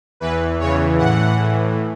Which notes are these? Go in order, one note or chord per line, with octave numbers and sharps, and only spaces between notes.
E2 E3 B4
E2 C#3 E3 C#5
A2 E3 F#5
A2 E3